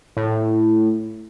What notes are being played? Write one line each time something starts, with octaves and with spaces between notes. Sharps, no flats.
A2